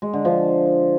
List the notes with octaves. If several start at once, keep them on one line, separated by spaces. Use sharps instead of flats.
G#3
D3
F3